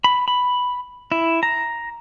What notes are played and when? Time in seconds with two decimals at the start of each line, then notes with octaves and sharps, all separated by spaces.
0.04 B5
0.28 B5
1.12 E4
1.43 A#5